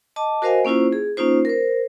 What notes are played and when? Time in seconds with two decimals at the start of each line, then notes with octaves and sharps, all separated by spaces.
0.16 D#5 A5 D6
0.42 F#4 A#4 C5 D#5 F5 G#5
0.65 A#3 C#4 E4 F4 C5
0.93 G#4
1.17 A#3 C#4 D#4 F4 C5
1.45 A#4 C5